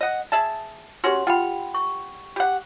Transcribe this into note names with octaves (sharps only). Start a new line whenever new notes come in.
D#5 F#5
G#4 E5 A5
C#4 F#4 G4 C6
F4 F#5 G5 B5
C#6
G4 F#5